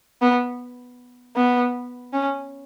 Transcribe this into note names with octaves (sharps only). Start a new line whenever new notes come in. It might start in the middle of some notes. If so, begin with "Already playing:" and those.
B3
B3
C#4